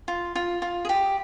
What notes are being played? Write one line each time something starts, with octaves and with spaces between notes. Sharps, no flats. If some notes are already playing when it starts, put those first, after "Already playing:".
F4
F4
F4
G#4
G4